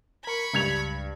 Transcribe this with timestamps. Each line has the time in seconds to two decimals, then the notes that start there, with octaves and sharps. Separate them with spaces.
0.24 A#4 B5 C#6 G#6
0.54 C#2 G2 G#6 F7